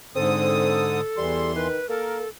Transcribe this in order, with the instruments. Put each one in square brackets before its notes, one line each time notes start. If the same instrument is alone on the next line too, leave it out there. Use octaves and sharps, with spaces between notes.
[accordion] G#2 D3 D#6 [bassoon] C4 [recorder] A4
[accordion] E2 E3 C6 [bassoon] G3
[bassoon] D#3 [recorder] B4
[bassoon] A#3 [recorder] A4 [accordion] A#4